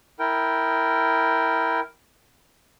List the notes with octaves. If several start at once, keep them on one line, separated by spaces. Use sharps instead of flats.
E4 A#4 G5